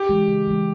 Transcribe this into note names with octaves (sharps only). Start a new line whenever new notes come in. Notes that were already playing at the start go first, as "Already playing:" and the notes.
Already playing: G4
E3 G#3
C#3
E3 G#3